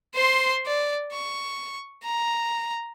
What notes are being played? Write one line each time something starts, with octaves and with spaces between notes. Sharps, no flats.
C5 C6
D5
C#6
A#5